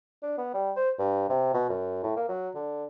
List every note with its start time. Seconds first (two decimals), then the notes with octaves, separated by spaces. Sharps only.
0.23 D4
0.38 B3
0.54 G3
0.76 C5
0.99 G2
1.29 C3
1.54 B2
1.69 F#2
2.03 A2
2.17 A#3
2.29 F#3
2.55 D3